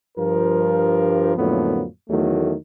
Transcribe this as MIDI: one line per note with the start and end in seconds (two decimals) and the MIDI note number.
0.17 1.32 43
0.17 1.32 53
0.17 1.32 70
1.37 1.85 41
1.37 1.85 45
1.37 1.85 50
1.37 1.85 54
1.37 1.85 58
1.37 1.85 59
2.09 2.53 40
2.09 2.53 51
2.09 2.53 54
2.09 2.53 57